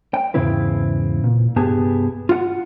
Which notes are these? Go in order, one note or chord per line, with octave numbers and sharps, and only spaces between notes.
G5
E2 G#2 C#3 C4 E4 B4
A#2
C2 G2 B3 G4 G#4 A5
F4 F#5